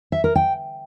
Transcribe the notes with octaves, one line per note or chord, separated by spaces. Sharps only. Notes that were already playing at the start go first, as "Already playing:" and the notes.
E5
A#4
G5